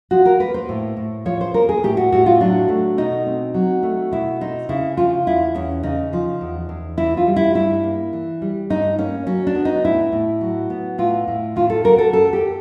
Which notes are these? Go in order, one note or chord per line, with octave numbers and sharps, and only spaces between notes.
F3 F#4
A#4
A#3 B4
C5
A2
A2
F3 C#5
C5
A#3 A#4
G#4
A2 G4
F#4
A2 F#4
F4
F#3 D4
A3
B2 D#4
C4
F#3
A3
B2 E4
C4 D#4
C#3 E4
F3 F4
E2 E4
E2 C#4
C#3 D#4
F3
E2
E2
E3 E4
F4
G3
E4
G2 E4
A#3
E3
G3
G2 D#4
A#3 C#4
F#3 C#4
D4
B3
D#4
A2 E4
A2
F#3
B3
A2 F4
A2
D#3 F4
A4
F#3 A#4
A4
F#2 A4
G4